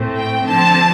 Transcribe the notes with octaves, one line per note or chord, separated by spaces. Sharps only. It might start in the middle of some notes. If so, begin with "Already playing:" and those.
Already playing: A2 A3 C4
G5
D3 F3 C4 A5